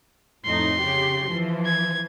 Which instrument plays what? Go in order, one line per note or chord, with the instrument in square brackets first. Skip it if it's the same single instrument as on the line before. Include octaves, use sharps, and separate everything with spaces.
[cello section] F2 A2 D#4 [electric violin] C6
[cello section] C#3 G4
E3 F3
[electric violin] G#6